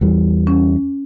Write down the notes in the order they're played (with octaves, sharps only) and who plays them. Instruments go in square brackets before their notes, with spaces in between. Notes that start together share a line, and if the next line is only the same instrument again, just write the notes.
[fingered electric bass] E2 E3 G3
[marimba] C#4